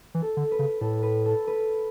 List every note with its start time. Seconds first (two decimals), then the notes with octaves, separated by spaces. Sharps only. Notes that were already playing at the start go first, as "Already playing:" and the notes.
0.14 E3
0.22 A4
0.37 D3
0.51 B4
0.59 C#3
0.81 A2 A4
1.02 B4
1.26 A4
1.47 B4